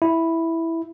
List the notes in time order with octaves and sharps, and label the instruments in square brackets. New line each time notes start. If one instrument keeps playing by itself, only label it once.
[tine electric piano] E4